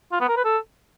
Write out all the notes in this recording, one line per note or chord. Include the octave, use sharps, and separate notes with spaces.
F4
B3
A#4
B4
A4